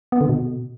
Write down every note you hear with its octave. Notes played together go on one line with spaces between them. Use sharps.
B3
D3
B2